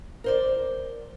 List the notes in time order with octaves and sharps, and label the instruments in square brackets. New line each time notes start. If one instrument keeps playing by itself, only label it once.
[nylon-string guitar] A#4 C5 D5